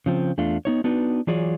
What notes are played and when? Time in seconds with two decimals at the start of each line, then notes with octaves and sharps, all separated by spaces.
0.06 C#3 F3 C4
0.38 E2 A3 D4 F4
0.65 B3 D#4 C#5
0.84 B3 D4 D#4 F#4 B4
1.27 E3 F#3 F4 G#4 C#5 D5